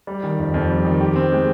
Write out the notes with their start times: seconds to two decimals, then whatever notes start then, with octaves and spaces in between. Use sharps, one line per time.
0.07 G3
0.23 D#3
0.39 F2
0.54 F2
0.70 G3
0.85 D#3
1.01 G4
1.16 C4
1.32 G#3